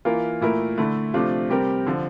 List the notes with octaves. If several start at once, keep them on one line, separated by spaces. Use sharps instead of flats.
E3 A#3 F4 A#4
A#2 A3 E4 A#4
D3 A3 E4
C3 F3 A3 D4 F4
C3 G3 C4 G4 A#4
D3 F3